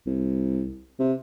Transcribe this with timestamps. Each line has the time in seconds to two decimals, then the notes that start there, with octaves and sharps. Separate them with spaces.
0.06 C2
0.99 C3